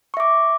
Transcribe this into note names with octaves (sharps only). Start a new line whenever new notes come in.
E5 C#6 D6